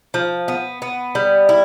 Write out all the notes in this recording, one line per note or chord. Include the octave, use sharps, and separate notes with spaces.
F3
B3
B3
G3
E4